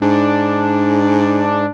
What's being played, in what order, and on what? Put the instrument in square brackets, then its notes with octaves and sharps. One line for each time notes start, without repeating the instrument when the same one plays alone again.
[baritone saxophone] G#2 [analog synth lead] D4